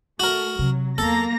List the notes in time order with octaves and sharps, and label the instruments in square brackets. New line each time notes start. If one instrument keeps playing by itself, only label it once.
[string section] A3 [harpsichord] F#4 A#4
[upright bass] C3 [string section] F#3
[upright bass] E2 F#3 [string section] A#3 A#5 A#6 [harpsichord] A4